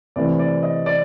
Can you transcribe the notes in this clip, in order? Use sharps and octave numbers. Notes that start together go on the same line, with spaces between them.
C3 E3 A3 C4 D5
D5
D#5
D5